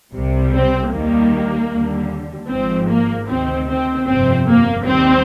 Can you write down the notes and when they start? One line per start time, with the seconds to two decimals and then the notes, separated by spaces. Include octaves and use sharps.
0.14 C2 C3 G3
0.53 C4
0.92 D#2 D#3 G3 A#3
1.71 D#2 D3 G3
2.50 G#1 G#2 F3 C4
2.89 A#3
3.28 D2 C3 D#3 C4
3.67 C4
4.07 G1 F2 C3 C4
4.46 A#3
4.85 D#2 D#3 G3 C4